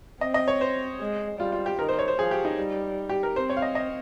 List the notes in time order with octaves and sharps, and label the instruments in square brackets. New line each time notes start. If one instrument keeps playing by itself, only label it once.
[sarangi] C4 [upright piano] D#5
[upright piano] D#5
C#5
C5
[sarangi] G#3
[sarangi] G3 [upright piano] F4
[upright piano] F4
G4
[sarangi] D#3 [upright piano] A#4
[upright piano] C5
C#5
C5
[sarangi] F3 [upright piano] G#4
[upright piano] G4
D#4
[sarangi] G3
[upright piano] G4
A#4
[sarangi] C4 [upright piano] C5
[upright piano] C#5
F5
D#5
D#5